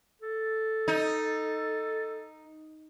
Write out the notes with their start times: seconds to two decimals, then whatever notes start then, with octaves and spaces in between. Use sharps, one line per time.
0.22 A4
0.88 D#4